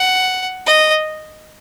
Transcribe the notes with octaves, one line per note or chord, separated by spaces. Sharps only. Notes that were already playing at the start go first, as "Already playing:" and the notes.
Already playing: F#5
D#5